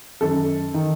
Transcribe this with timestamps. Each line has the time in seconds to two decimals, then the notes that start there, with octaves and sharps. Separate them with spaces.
0.21 F#2 D#3 A4
0.74 D#3